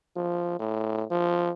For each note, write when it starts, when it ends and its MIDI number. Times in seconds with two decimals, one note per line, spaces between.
0.16 0.58 53
0.59 1.04 45
1.11 1.51 53